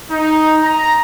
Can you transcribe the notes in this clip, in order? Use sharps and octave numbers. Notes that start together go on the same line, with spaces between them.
D#4
A#5